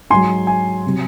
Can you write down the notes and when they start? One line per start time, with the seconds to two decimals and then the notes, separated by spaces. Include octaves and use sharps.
0.10 G#2 F#3 G#5 C6
0.47 G#5
0.86 C3 F#3